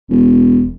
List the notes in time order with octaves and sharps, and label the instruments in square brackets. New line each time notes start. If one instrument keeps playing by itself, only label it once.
[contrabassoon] E1